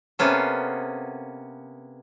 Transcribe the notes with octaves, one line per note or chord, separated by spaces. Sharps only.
C3 A#3 B3 C#4 A4